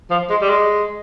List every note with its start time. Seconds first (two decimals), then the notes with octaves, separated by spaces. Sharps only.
0.11 F3
0.30 G#3
0.41 G3
0.49 G#3